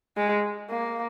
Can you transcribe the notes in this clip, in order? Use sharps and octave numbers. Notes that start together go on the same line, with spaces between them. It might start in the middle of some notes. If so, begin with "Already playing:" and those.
G#3
A#3